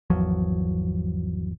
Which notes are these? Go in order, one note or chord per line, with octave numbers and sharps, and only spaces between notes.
G#1 E2 F3 F#3